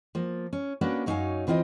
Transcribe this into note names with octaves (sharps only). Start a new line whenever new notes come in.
F3 A#3
C#4
A#3 C#4 D4 F#4 B4 D5
F#2 F#3 D#4 C#5 F5 G#5
D2 E3 C4 F4 D#5 G5